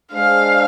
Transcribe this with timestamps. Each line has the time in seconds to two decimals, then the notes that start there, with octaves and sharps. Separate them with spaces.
0.12 G#3 D4 G#4 C5 F5